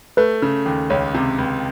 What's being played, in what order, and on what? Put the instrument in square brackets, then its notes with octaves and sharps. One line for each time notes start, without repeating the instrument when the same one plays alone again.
[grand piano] A3 [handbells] B4
[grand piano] C#3
D#2
[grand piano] C#2 [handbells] C#5
[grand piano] C3
C#2